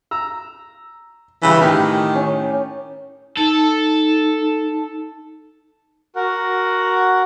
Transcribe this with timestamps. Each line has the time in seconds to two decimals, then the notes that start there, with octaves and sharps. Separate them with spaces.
0.11 A#5 E6
1.42 C#3 E3 G3 C#4
1.61 A2 D#3 G4 G#5
2.15 C#4
3.37 D#4 A4
6.15 F#4 A#4 F#5